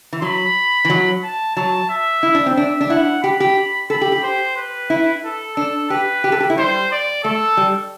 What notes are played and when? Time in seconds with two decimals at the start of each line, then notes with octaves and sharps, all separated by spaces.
0.13 E3
0.22 F#3 B5
0.85 E3
0.90 F#3
1.23 A5
1.56 F#3 A5
1.90 E5
2.23 E4
2.35 D4
2.46 C4
2.56 D4 E5
2.81 D4
2.90 E4 F#5
3.23 G4 B5
3.40 G4
3.90 A4 B5
4.01 G4
4.12 G4
4.23 C5
4.56 B4
4.90 E4
5.24 A4
5.57 D4 A4
5.90 G4 B4
6.24 G4
6.32 A4
6.40 G4
6.50 E4
6.58 G3 C5
6.91 D5
7.24 A3 A4
7.57 G3